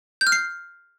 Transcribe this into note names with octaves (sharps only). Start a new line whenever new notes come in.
G6
F6
C7